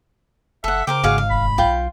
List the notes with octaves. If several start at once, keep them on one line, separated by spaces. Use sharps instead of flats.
F#1 A4 E5 F#5
C#3 A#4 C5 G5 D6
G#1 G#2 F#4 G#4 F5
F5
F1 B5
B1 F4 G5